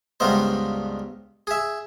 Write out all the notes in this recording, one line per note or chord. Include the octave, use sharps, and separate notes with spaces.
C#2 G2 G3 B3 D#4 C5
G#4 E5